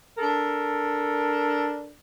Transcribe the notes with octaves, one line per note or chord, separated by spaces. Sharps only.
D4 A4 A#4